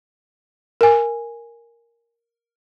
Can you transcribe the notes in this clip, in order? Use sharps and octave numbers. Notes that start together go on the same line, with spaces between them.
A#4 G#5